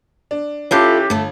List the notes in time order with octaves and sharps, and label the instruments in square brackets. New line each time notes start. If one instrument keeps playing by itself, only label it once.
[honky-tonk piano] D4
[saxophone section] E3 G4 [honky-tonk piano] C#4 [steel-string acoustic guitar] E4 F4 A4
[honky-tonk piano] G1 [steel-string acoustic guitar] A3 A4